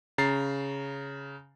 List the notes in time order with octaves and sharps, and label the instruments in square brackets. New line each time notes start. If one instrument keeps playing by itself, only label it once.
[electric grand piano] C#3 A#5 A6 C7